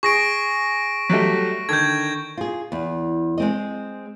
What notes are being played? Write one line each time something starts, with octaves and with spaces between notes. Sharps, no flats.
G#4 C#6 A#6 D7
F#3 G3 A3
D3 D#3 G6 G#6
F4 G#4
E2
G#3 C4 D#5